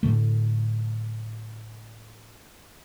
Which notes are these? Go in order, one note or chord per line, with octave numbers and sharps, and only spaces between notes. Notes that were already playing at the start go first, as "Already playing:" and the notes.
A2 D3 A3